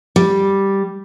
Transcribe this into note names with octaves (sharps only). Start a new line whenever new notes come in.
G3